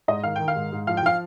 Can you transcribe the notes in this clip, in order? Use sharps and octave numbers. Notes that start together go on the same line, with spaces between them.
G#2 D#5
D#3 F5
D#3 G5
F5
G#2
G#2
F3 F5
G5
F3 F5